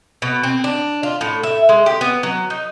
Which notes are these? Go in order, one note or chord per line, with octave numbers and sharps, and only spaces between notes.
B2
C4
D4
F4
A2
E5
G#3
G4
B3
F#3
D#4